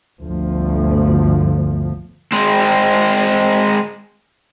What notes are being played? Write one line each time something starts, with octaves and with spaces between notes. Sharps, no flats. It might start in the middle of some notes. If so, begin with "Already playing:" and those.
G1 D2 F3
G#3 C4